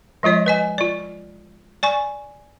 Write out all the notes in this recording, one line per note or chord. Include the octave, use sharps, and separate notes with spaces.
F3 G#3 F4 C#5 D#5
B4 D#5 G#5
F4 D5
D5 G#5 C#6